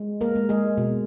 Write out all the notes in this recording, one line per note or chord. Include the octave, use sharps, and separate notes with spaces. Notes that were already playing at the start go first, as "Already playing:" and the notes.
Already playing: G#3
A#3 A#4
G#3
G#3 G#4
B2